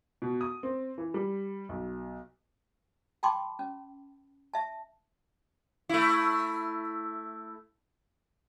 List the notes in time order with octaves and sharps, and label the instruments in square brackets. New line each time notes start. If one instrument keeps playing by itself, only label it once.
[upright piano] B2
D#6
C4
E3
G3
B1
[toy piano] G5 A5 B5 C6 D6
C#4
E5 A5
[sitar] A3 E4